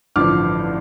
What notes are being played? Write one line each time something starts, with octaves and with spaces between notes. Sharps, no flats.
A1 G2 D3 F3 D6 F6